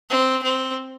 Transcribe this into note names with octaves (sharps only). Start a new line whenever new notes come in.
C4
C4